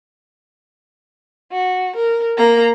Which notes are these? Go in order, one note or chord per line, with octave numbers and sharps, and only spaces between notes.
F#4
A#4
A#3 A#5